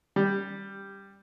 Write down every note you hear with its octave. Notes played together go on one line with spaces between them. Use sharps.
G3